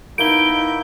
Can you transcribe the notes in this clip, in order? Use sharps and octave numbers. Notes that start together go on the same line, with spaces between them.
A#3 B3 D#4 E4 G6 D7 G7